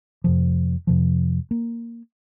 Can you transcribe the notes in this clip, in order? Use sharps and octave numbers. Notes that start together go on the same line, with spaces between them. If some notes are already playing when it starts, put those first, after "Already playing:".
F2 C3 F3
F2 C3 F3
A#3